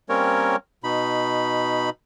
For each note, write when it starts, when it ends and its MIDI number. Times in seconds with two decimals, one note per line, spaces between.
0.09 0.56 55
0.09 0.56 58
0.09 0.56 60
0.09 0.56 61
0.09 0.56 70
0.09 0.56 73
0.84 1.90 47
0.84 1.90 63
0.84 1.90 83